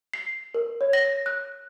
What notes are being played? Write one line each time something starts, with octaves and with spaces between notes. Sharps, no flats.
C7
A#4
C#5
A#6
F#6